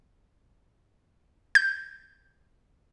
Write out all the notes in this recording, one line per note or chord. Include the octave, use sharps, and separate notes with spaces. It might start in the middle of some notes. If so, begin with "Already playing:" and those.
G6